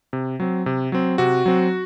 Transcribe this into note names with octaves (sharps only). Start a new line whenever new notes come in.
C3
F#3 C4
C3
F#3 C4
C3 F#4
F#3 C4